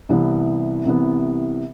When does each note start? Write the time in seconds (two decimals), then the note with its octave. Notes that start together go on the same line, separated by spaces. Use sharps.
0.09 C2 C3 E3 B3
0.85 C2 C3 E3 B3